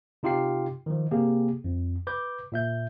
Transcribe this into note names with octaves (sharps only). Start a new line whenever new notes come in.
C3 D#4 F4 G4 G5 C7
D#3 F3
C3 A#3 G4 G#4
F2
B4 D6 G6
A#2 E5 G6